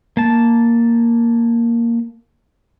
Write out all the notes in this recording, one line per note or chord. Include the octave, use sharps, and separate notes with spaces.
A#3 A5